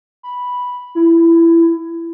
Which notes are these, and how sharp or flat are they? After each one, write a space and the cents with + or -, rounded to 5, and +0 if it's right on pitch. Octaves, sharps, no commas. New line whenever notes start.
B5 -5
E4 +20